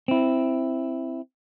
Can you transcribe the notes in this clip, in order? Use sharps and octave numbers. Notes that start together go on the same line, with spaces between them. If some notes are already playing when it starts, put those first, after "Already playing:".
C4 E4